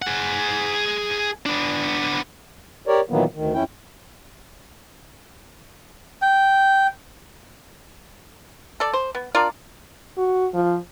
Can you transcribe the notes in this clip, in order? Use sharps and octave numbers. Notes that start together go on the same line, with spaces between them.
G#4 F#5
B3 D4
G4 A#4 C#5 D5
A#2 D#3 E3 F#3 A#3 B3
D2 D#3
F2 C#4 E4 G5
G5
A4 D5
C5
B3
D4 F4 A#4 D5
F#4
F3